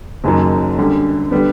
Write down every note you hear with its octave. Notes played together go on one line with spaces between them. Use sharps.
F#1 F#2 D#3 F#3
F#2 D3 G3
D3 G3 B3